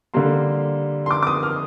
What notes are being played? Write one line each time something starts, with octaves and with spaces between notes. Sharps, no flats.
D3 G3 A#3 C6
C6
D6
D6
D#6
F6